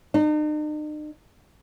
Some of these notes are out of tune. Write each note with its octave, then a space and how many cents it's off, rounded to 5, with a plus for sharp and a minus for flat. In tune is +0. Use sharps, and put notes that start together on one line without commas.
D#4 -45